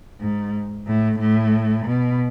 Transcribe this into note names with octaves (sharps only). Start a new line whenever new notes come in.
G#2
A2
A2
B2